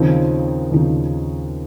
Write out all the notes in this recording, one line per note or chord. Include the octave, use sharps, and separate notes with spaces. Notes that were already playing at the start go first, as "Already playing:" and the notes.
Already playing: D#2 C#3 F3 C4 D#4
D#2 C#3 F3 C4 D#4